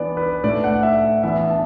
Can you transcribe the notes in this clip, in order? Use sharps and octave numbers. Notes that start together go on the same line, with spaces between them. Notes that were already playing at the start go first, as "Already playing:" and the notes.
Already playing: E3 B3 D4 D5
B4
A2 A3 D4 D5
F#5
E5
E3 B3 D4 E5
A5